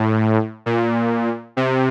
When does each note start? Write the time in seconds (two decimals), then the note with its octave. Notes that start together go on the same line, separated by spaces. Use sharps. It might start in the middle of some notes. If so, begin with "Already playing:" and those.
Already playing: A2
0.66 A#2
1.57 C3